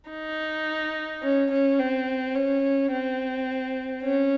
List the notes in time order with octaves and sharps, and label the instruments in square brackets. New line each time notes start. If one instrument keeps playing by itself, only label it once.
[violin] D#4
C#4
C#4
C4
C#4
C4
C#4